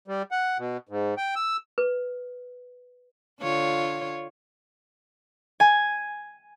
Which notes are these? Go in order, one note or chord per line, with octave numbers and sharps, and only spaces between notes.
G3
F#5
B2
G#2
G5
E6
B4
D3 F4 C#5
G#5